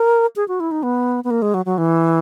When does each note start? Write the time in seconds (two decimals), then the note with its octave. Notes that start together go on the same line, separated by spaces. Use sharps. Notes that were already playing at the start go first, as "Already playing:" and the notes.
Already playing: A#4
0.36 G#4
0.48 F#4
0.60 E4
0.71 D#4
0.83 B3
1.24 B3
1.31 A#3
1.42 G#3
1.54 F#3
1.66 F#3
1.78 E3